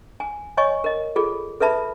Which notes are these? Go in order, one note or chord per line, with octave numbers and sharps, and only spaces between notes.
G#5
C#5 D#5 G#5 C#6
A#4 D#5
F4 G#4 A4
A4 B4 E5 A5 B5